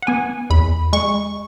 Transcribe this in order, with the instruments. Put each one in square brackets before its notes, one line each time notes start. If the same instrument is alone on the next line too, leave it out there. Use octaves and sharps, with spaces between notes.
[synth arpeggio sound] F#5
B3 G#5
E2 B5
G#3 C#6